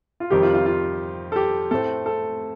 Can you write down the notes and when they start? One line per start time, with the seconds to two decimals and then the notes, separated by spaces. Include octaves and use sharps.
0.20 F4
0.30 F2 C3 D#3 G3 G4
0.43 F4
0.54 F4
0.66 F4
1.32 A4
1.36 G4
1.71 A2 A3 C4 A4
2.06 A4